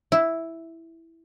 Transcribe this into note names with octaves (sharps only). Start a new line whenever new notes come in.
E4